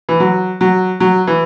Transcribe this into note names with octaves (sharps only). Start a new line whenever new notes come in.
E3
F#3
F#3
F#3
E3